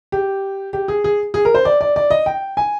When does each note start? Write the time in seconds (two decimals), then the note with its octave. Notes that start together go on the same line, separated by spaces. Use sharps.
0.12 G4
0.73 G4
0.88 G#4
1.04 G#4
1.34 G#4
1.45 A#4
1.55 C5
1.65 D5
1.81 D5
1.96 D5
2.11 D#5
2.26 G5
2.57 G#5